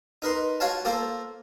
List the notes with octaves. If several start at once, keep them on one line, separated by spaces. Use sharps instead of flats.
D#4 A#4 B4 C6
F4 F#4 C#5 F5 A5
A#3 F4 A4 C5